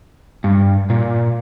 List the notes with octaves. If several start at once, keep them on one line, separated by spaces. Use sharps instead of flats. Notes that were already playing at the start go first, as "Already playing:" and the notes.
G2
A#2